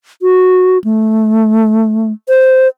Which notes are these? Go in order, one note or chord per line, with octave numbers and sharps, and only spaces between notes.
F#4
A3
C5